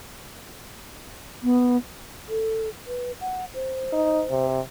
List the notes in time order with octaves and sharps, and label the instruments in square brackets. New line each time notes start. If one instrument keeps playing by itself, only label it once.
[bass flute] B3
[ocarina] A4
B4
F#5
C5
[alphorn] D#4
C3